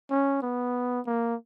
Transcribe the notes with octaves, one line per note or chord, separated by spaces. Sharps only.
C#4
B3
A#3